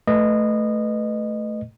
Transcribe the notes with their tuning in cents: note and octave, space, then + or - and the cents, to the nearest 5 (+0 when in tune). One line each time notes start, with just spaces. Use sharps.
A3 +0 B4 +0 D#5 -20